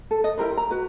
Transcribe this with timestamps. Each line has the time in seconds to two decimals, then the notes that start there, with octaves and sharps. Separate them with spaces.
0.11 A4
0.24 D#5
0.38 E4 G4 A#4 C5
0.57 A#5
0.71 F#4 B4